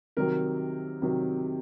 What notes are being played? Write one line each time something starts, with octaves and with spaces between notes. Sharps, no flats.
C3 D#3 F#3 A#4
C3 D#3 F#3